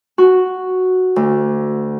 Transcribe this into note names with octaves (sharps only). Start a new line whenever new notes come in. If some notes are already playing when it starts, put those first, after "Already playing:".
F#4
D2